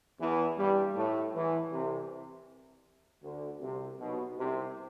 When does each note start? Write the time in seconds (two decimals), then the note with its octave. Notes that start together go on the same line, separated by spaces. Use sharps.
0.20 E2 E3
0.58 G2 G3
0.95 A2 A3
1.33 E2 E3
1.71 C2 C3
3.23 D2 D3
3.61 C2 C3
3.99 B1 B2
4.37 C2 C3